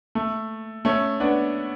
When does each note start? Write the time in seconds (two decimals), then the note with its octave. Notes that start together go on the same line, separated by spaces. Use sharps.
0.15 A3
0.85 A3 C#4
1.20 B3 D4